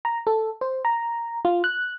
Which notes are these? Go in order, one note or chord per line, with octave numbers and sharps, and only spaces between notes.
A#5
A4
C5
A#5
F4
F#6